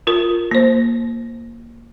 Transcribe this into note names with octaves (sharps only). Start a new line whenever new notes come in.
F4 A#4
A#3 C5